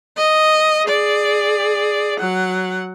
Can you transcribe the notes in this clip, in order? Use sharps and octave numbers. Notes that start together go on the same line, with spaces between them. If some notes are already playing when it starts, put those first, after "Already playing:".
D#5
G#4 D5
F#3 F#5